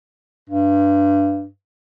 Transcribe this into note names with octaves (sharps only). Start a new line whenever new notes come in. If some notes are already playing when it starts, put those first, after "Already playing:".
G2